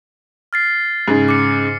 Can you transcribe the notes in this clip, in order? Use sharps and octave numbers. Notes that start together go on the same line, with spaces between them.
F6 A6 C7
G#2 C#3
D6 C#7